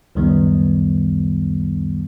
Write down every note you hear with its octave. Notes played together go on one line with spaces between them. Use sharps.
C#2 F#2 D#3 G3 B3